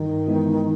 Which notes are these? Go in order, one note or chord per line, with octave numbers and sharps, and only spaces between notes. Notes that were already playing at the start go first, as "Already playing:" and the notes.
Already playing: G2 D#3
E3 G#3 B3 E4